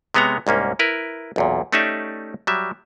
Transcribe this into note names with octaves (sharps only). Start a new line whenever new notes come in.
C3 G#3 B3 C#5 A#5
C2 G#2 A#3 C#4
E4 A#4 B4
B1 E2 A#2
A3 C#4 D#4 G4 D5 E5
F#3 G3 E5